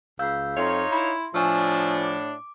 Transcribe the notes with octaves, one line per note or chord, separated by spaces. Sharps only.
C#2 F5 E6 G6
F2 D#4 F4 C#5 E5 C6
E4
A2 F3 D4 G#5 C#6 E6
D6